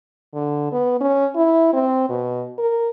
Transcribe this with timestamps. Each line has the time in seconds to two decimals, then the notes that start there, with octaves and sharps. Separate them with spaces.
0.34 D3
0.72 B3
1.01 C#4
1.35 E4
1.73 C4
2.09 B2
2.58 A#4